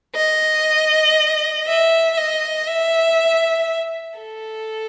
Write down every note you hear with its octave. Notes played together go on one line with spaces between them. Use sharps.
D#5
E5
D#5
E5
A4